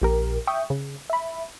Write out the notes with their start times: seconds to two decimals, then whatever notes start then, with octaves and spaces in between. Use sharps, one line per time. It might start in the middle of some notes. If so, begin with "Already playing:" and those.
0.02 A#1 G4 A#4
0.47 E5 G5 C#6 D#6
0.70 C#3
1.10 E5 B5